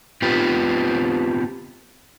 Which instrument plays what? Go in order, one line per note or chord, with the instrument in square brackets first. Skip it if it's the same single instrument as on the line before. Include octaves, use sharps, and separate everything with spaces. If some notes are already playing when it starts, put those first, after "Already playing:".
[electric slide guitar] B3 C4 F4 G4 B4